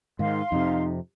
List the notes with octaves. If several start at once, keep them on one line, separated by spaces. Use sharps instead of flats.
G#2 D#3 F5 C6
F2 C3 D#4